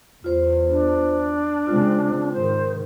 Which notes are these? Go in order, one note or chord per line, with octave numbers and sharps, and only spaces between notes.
E2 F4 C5
D4
C#3 G#3 C4 F4
G#2 D#3 C5